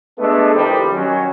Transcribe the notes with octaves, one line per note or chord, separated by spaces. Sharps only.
G#3 A3 B3 D4 A4
C2 F2 D#3 G3 G4 C5
D#3 F#3 C#4